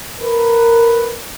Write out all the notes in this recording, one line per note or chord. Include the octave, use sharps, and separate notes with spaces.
A#4 B4